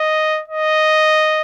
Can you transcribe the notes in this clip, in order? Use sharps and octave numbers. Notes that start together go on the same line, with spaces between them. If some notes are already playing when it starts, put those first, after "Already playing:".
Already playing: D#5
D#5